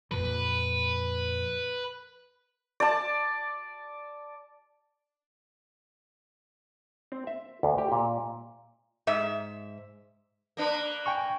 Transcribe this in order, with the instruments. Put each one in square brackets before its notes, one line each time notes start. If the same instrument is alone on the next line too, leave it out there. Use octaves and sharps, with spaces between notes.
[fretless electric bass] F2 A#2 F3 [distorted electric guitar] B4
[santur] D5 A5
[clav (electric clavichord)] C4
E5
D2
G4
A#2
[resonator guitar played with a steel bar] G#2 E5
[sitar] A#3 D4 B4
[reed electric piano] G5 G#5 C#6